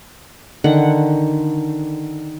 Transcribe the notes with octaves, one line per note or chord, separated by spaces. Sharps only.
D3 D#3 F#5